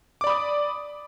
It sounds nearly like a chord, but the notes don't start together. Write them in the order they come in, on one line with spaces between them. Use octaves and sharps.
D6 D5 B5 D#6